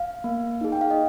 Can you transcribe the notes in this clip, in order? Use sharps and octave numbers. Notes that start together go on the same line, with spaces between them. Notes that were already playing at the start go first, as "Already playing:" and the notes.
Already playing: F5
A#3
D#4 G#4
G5
F5
D#5